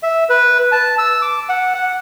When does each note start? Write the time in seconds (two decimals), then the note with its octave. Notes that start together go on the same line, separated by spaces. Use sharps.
0.03 E5
0.29 B4
0.72 A5
0.98 E6
1.22 D6
1.49 F#5
1.74 F#5